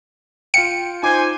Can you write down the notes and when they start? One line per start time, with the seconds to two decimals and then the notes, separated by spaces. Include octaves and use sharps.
0.54 F4 F5 G5 C#7
1.03 D#4 F4 C5 G#5 D6